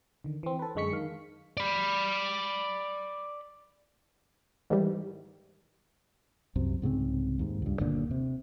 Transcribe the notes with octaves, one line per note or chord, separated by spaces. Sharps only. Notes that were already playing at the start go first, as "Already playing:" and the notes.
D3 D#3
E3 C4
A4 B4
F#2 D3 G#3 C#6 B6 C#7
D#3 F5
D5 B5
G#2 D#3 E3 G3
C2 F#2 C3
C2 G#2 C#3 C4
D#2 G#2
C#2 G2
G1 D#2 A#2 D3
C3